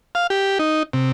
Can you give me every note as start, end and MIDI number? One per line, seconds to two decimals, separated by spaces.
0.15 0.27 77
0.30 0.58 67
0.59 0.83 63
0.93 1.12 48